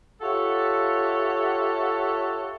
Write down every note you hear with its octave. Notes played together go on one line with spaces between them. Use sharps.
F4 G4 A4 C#5 E5 F#5